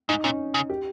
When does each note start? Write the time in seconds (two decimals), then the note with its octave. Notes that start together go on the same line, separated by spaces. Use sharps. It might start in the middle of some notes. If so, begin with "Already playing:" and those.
0.09 G#2 D#4
0.24 A#2 C#4
0.54 C#3
0.70 G4